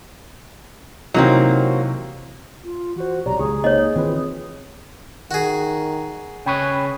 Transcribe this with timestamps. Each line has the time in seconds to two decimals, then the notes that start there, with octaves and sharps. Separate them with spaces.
1.14 C3 E3 F#3 A#3 C4 D#4
2.64 F4
2.96 E3 F#4 C5
3.26 B1 C3 G4 C#5 D5 A#5
3.39 C#2 G4 G#4 A#5
3.64 A#3 D#4 C#5 D#5
3.96 D#3 E3 C4 F4 B4
5.31 D#3 F#4 G#4
6.46 C#3 C#4 G#4 B4 G5 B5 C#6